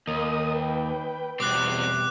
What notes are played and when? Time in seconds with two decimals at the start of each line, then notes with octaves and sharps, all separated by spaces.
0.07 D#2 A#4 D#5 D#6
0.55 B4 G5
1.40 E2 B2 G3 C4 D6 F#6